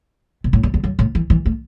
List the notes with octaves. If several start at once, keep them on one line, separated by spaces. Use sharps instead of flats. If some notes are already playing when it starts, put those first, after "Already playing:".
B2
A2
E2
E2
F#2
A2
E3
E3
A3